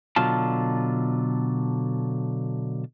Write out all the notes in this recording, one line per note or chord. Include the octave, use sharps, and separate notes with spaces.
B2 D3 F#3 F4 A5